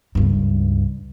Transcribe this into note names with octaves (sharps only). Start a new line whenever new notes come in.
C#2 G2